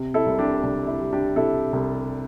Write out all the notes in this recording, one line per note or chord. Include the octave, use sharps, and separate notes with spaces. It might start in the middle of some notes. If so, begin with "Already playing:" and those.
Already playing: C3
E4 A4
C2
D4 G4
C2 D4
E4
G3
D4 G4
C3 E4 A4
C2